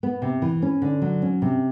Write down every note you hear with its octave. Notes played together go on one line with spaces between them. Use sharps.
B3
C3
E3
C#4
D3
F#3
C#4
C3